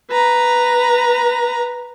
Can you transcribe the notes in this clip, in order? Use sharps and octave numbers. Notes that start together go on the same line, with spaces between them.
B4 A#5